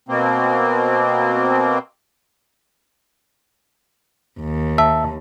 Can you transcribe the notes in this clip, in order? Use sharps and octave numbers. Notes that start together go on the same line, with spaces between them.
B2 A#3 C4
D#2
E5 A5